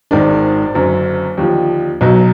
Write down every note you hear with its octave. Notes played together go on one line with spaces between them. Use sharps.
G#1 G#2 D#3 G#3 D4 D5
F#1 F#2 D3
D#2 D3 F3
B1 B2 F#3